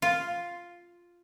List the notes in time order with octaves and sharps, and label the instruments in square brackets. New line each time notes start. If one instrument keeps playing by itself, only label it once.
[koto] F4